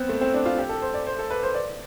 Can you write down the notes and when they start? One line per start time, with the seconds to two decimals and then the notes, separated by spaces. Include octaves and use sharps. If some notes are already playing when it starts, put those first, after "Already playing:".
Already playing: B3 C4
0.09 A3
0.21 C4
0.34 D4
0.46 F4
0.58 G4
0.69 A4
0.82 C5
0.94 D5
1.07 C5
1.19 A4
1.30 B4
1.43 C5
1.55 D5